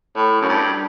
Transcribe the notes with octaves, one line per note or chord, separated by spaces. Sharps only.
A2
F#2
G2